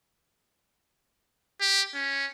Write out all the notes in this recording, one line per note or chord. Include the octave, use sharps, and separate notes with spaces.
G4
C#4